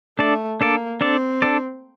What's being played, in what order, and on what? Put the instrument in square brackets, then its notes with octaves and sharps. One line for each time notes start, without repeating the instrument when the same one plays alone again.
[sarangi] A3 [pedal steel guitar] D4 A4 D5
[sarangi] A#3 [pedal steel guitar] D4 A4 D5
[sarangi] C4 [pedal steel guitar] D4 A4 D5
[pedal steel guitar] D4 A4 D5